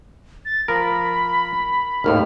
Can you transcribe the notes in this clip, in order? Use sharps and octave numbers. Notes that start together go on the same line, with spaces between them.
A6
F3 A#4 B5
G#1 D#2 A2 F6